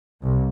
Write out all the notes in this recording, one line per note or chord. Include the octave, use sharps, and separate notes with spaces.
C2